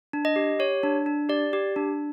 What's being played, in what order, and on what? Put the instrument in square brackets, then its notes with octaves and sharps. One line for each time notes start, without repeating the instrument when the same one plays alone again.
[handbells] D4
D#5
G4
G4 C#5
D4
D4
G4 D5
G4
D4